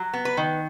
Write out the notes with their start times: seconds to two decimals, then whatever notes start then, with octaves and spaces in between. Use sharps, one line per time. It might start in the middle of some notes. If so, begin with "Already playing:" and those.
Already playing: F#3
0.14 B3
0.25 B4
0.37 D#3